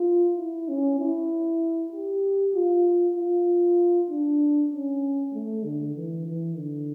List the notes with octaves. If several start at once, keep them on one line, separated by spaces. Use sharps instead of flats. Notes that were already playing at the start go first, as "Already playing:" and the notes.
Already playing: F4
E4
C#4
E4
G4
F4
F4
D4
C#4
A3
D3
E3
E3
D3